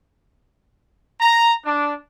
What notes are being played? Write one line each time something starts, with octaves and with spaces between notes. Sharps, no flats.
A#5
D4